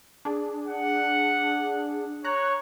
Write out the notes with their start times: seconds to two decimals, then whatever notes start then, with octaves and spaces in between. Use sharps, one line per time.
0.25 D4 G#4
0.67 F#5
2.24 C#5 A#5 F#6